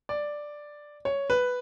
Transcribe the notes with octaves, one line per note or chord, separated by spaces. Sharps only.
D5
C#5
B4